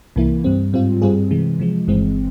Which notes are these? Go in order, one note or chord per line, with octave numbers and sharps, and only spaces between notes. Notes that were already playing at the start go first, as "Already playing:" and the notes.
C2 C3 E3 A#3 E4
G2 G3 C4
G#2 G3 C4 F4
G2 G3 C4 F4 G#4
C3 E3 G#3
C3 F3 G#3
G1 G2 E3 G#3 C4